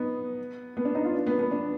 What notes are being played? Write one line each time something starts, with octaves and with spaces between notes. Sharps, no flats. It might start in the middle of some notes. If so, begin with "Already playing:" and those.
Already playing: B3 D#4
B3
D4
D#4
F4
D4
B3
B3
D4